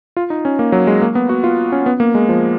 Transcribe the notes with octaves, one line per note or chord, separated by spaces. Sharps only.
F4
D#4
C#4
A#3
F#3
G#3
A#3
B3
F#4
F4
C#4
B3
A#3
G#3
F3